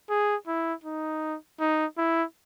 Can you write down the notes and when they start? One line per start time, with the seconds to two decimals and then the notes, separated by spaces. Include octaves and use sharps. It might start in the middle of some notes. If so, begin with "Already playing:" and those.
0.09 G#4
0.47 E4
0.84 D#4
1.60 D#4
1.97 E4